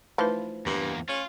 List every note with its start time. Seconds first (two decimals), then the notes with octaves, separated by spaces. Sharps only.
0.18 E3 F3 A3 D#4 B4
0.66 E2 G2 A#3
1.09 C#4 F4